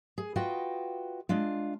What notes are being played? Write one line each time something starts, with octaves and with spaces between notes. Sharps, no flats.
G#4
F4 F#4 B4 D#5 G5
G#3 D4 F4